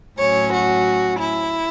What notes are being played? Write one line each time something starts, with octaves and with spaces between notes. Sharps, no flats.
A2 F#3 C#4 C#5
F#4
E4